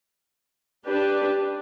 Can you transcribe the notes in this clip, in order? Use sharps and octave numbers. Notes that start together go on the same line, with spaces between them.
D4 G4 B4